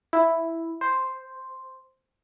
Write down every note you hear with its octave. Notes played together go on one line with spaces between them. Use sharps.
E4
C5